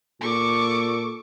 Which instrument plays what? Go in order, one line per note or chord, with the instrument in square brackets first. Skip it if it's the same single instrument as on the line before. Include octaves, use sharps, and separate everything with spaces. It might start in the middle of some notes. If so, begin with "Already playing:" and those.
[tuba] A#2 [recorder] A4 [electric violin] C#6 D6